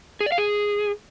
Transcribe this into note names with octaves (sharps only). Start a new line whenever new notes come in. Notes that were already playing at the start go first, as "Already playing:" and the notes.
G#4
D5
F5
G#4